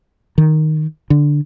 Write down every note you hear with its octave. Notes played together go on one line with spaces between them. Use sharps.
D#3
D3